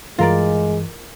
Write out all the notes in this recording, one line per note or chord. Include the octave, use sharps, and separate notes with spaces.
G2 E3 G#3 F4 A#4 D5